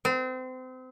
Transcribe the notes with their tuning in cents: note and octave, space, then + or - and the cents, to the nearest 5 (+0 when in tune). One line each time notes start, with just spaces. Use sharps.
C4 -30